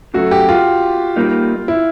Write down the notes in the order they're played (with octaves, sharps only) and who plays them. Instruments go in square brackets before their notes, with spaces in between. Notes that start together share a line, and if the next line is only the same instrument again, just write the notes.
[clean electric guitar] C#3 F#3 A3 [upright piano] F#4
[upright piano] G4
F4
[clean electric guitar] A#2 G3 A#3 D#4
[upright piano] E4